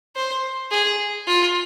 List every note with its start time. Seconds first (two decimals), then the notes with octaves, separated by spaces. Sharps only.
0.16 C5
0.71 G#4
1.27 F4